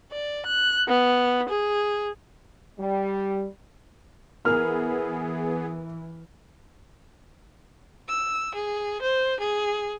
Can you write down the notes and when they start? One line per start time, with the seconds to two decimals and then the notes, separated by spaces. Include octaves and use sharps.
0.12 D5
0.46 F#6
0.88 B3
1.49 G#4
2.79 G3
4.45 E3 B3 G#4 A#4 F6
8.09 E6
8.55 G#4
9.02 C5
9.40 G#4